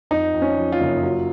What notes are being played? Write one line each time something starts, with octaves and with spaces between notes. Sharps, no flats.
F2 D#4
F2
C#4
F3
F4
F#1
F#3